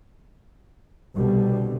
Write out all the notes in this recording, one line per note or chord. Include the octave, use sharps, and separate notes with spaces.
C2 B2 D3 G3